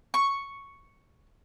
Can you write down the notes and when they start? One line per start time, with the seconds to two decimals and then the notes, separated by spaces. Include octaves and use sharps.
0.14 C#6